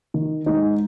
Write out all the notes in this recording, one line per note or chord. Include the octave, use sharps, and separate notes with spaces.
D#3
G#3 D#4